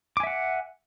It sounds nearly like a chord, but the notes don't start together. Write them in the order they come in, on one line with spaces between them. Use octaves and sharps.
D6 G#5 E5 F#5